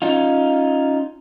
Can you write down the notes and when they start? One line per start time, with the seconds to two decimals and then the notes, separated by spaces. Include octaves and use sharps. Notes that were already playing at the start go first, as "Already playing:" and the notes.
0.02 C#4 D#4 F4